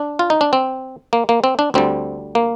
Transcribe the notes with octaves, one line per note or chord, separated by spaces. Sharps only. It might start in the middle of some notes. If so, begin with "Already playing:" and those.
Already playing: D4
F4
D#4
D4
C4
A#3
A#3
C4
D4
D2 D3 G3 C4
A#3